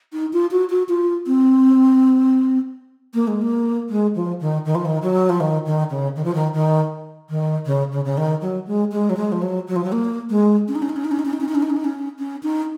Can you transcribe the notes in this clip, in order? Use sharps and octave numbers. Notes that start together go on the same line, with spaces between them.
D#4
F4
F#4
F#4
F4
C4
A#3
G#3
A#3
G#3
F3
D#3
D#3
F3
D#3
F#3
F3
D#3
D#3
C#3
D#3
F3
D#3
D#3
D#3
C#3
C#3
C#3
D#3
F#3
G#3
G#3
F#3
G#3
F3
F#3
F#3
F3
F#3
A#3
G#3
C#4
D#4
C#4
D#4
C#4
D#4
C#4
D#4
C#4
D#4
C#4
D#4
C#4
D#4
C#4
D#4
C#4
C#4
D#4